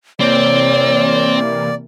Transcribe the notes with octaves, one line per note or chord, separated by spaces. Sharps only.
C3 E3 A#3 C4 C#5 D5